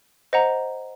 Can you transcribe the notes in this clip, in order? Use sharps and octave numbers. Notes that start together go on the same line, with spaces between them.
C5 D#5 F#5 A#5